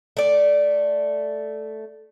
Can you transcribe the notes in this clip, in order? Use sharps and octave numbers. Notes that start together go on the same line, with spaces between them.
A3 D5